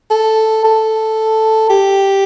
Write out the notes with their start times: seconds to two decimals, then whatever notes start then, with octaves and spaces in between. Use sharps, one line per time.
0.10 A4
0.65 A4
1.69 G4